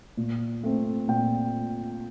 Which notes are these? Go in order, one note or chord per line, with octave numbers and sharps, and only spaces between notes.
A#2
A3 C4
A#2 G5